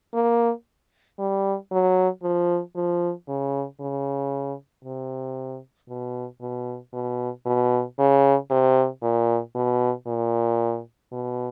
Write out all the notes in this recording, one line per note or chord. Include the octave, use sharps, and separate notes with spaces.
A#3
G3
F#3
F3
F3
C#3
C#3
C3
B2
B2
B2
B2
C#3
C3
A#2
B2
A#2
B2